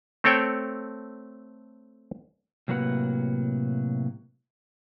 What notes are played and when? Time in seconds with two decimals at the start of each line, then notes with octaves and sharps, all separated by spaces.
0.24 A3 C4 A4 C#5 G5
2.68 A2 C3 F#3 A#3 B4 F#5